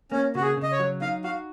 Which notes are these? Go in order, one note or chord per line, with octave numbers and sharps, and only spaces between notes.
A#3 C#4
C#3 F#4
G#4
C#3
D#5
C#5
F#3
D#4 F5
F#4 F5